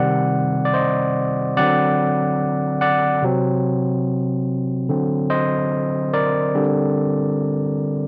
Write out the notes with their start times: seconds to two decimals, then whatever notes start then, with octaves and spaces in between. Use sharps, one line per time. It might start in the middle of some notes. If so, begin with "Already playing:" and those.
Already playing: C3 D#3 G3 C4 D5 F#5
0.65 D5
0.74 C5 D#5
1.57 D3 F#3 C4 D5 F#5
2.81 D5 F#5
3.22 C3 F#3 C4
4.89 D3 F#3 C4
5.30 C5 D#5
6.13 A#4 D5
6.55 D3 G3 C4